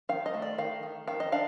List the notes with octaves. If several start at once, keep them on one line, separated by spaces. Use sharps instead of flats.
D#3 F5
D#5
A3
D5
D#3 F5
D#3
D#3 F5
D#5
D4 F5